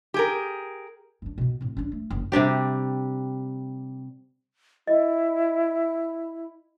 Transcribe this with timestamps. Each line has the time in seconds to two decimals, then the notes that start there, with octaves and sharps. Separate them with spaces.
0.14 G4 G#4 A#4
1.22 F#2 D4
1.38 B2 B3
1.61 A2 C4
1.77 C#4 D4
1.92 A3
2.10 F#1
2.32 C3 G3 D4 G4
4.87 E4 D#5